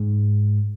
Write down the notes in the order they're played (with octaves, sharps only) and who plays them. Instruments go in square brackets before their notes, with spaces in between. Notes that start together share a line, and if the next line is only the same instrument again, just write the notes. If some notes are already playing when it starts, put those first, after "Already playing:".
Already playing: [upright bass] G#2